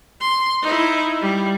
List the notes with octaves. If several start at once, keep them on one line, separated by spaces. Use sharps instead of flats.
C6
D#4 E4
G3